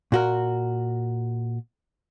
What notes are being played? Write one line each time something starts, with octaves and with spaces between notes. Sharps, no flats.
A#2 F#4 A#4